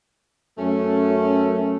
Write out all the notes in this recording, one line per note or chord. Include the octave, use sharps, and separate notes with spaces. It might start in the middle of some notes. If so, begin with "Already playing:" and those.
F#2 A3 C#4